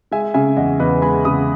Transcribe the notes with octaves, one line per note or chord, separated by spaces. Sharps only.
G#3 E5 G#5
C#3 E5 G#5
E2 D#5 F#5
E2 B4 D#5
G#3 G#5 B5
C#3 B5 D#6